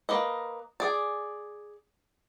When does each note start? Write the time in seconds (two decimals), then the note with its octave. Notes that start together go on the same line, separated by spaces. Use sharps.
0.09 A#3 B4 D#5
0.80 G#4 D5